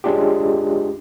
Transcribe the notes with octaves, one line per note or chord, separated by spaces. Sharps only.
G#3 C#4 D4 F4 G4